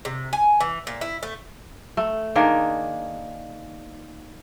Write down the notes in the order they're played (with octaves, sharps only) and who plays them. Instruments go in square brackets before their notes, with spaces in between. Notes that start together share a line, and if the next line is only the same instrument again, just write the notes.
[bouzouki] C3
G#5
E3
A#2
E4
A3
[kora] A3
D#3 A#3 D4 G#4